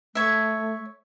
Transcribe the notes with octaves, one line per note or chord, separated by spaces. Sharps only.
A3 C#5 E5